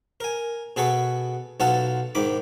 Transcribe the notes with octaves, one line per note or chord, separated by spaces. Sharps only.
A#4 G#5
B2 G#4 A4 B4 F#5 C#6
B1 B3 F4 A4 F#5 A5
G#2 D#3 B5 D6